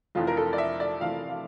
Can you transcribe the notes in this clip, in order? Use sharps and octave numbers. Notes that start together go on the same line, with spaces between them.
F1 F2 E3 F4
A#4
A4
D5
E5
D5
F1 F2 E3 F5
F5